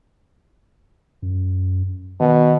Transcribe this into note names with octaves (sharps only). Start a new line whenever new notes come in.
F#2
B2 D#3